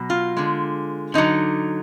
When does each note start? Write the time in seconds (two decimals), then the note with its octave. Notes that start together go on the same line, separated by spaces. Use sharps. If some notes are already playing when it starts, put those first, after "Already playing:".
Already playing: B2 F#3
0.10 F4
0.37 D3 G#3
1.14 D3 F#3 D#4